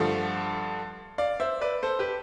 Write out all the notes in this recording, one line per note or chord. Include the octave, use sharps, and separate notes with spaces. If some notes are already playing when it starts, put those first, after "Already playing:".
Already playing: G2 D3 F3 A3
D5 F5
C5 E5
B4 D5
A4 C5
G4 B4